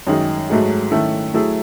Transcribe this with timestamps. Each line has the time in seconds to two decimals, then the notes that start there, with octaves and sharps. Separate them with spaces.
0.07 F#2 D#3 G#3 D#4 G#4
0.49 G#2 F#3 A3 D#4 G#4
0.91 D#3 A3 C#4 E4
1.34 F#3 A3 E4 G#4